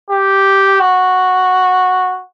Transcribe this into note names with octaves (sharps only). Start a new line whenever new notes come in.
G4
F#4